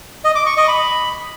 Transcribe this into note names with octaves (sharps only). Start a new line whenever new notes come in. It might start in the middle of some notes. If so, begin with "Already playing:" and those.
D#5
D6
C#6
D#5
B5